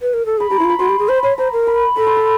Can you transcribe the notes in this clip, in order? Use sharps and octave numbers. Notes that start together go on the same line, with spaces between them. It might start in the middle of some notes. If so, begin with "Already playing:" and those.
B4
A#4
A4
G#4 B5
G4 A#5
E4 C6
F4 B5
F#4 C6
G4
G#4
C5 B5
C#5 B5
C5 A#5
A#4
B5
A4 B5
C6
B5